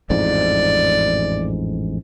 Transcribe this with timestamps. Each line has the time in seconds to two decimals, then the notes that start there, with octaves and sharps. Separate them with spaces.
0.10 A1 F2 G#2 D5